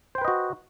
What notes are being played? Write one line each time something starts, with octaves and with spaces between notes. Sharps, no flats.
F#4 B4 C5 D#5 G5